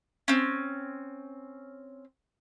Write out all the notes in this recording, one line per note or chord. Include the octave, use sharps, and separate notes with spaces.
C4 C#4